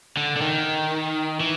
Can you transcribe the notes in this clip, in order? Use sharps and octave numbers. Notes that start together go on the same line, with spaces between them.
D3
D3
D#3
E3